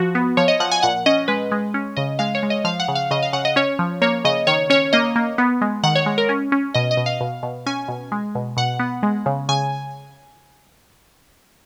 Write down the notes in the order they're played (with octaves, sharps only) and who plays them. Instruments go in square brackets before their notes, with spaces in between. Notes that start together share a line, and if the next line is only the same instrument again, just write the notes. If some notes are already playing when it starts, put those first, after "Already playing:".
Already playing: [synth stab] F3 F#4
B3
F3 C#5
D#5
F3 F#5
G#5
A#2 F#5
C#4 D#5
G#3 B4
G#3
C#4
C#3 D#5
G#3 F5
C#5
G#3
D#5
F3 F5
F#5
C#3
F5
C#3 D#5
F5
C#3 F#5
D#5
C#4 C#5
F3
A#3 C#5
C#3 D#5
D#3 C#5
C#4 C#5
A#3 D#5
A#3
B3
G#3
D#3 F#5
C#5
G#3
A#4
C#4
C#4
B2 D#5
D#5
B2
F5
B2
B2
C#4 G#5
B2
G#3
B2
B2 F#5
B3
G#3
C#3
C#3 G#5